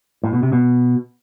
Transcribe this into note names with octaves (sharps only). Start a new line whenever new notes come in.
A2
B2
C3
B2